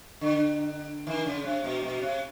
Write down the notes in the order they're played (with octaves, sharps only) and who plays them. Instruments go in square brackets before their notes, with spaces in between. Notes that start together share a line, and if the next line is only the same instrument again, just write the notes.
[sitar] D3
D#3
C#3
C3
B2
B2
C3